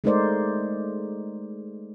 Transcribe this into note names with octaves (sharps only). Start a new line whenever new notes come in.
G#3 A3 D#4 A#4 C5 D5